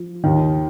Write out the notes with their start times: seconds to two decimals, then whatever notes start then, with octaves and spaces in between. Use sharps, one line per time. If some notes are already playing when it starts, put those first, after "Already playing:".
Already playing: F3
0.24 D#2 D#3